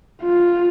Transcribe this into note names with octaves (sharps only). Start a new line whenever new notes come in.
F4